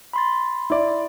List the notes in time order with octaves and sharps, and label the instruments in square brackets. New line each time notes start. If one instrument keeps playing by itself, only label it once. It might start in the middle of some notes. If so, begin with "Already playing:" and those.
[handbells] B5 C6 A6
[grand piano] E4 D5